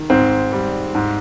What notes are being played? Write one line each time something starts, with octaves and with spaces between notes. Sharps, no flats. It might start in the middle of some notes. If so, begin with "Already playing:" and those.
Already playing: D#3
G#2 C4
G3
G#2